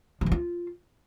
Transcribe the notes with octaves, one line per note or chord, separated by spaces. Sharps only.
F3
E3
F4